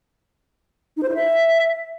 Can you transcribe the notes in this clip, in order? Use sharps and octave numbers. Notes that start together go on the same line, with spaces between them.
D#4
C5
E4
E5